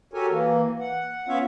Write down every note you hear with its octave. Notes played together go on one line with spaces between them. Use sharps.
F#4 G4 A4 A#4 C#5 G#5
E3 A#3
F#5
B3 C#4 F4 C#5 E5 F5